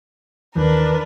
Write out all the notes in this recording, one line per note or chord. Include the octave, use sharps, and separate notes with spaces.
D#2 D#3 E3 D4 A#4 B4